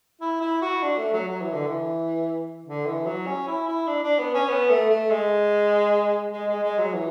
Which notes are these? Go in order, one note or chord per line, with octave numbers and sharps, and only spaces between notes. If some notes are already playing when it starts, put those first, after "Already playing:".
E4
E4
F#4
D4
A3
F#3
F#3
E3
D3
E3
D3
E3
F#3
C#4
E4
E4
D4
D4
B3
C#4
B3
A3
A3
G#3
G#3
G#3
G#3
F#3
E3